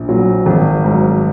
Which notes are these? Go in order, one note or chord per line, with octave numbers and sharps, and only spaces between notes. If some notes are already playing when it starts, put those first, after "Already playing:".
Already playing: A#1
A#2 F#3
G#1
G#2 F#3